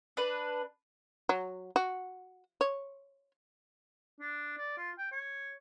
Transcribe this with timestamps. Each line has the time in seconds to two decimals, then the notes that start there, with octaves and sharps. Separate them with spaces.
0.17 D4 B4
1.29 F#3
1.76 F#4
2.61 C#5
4.20 D4
4.58 D5
4.77 F4
4.98 G5
5.12 C#5